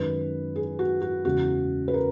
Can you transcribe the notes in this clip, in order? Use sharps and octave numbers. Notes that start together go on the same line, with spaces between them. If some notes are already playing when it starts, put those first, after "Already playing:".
Already playing: F#2 D#3 G#3 B4
G#4
F#4
F#4
E2 C#3 G#3 F#4
B4
A#4